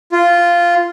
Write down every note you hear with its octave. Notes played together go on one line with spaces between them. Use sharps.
F4